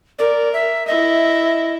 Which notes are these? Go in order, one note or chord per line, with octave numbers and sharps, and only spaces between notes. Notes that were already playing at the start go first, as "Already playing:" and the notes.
A#4 D5
E5
E4 D#5 E5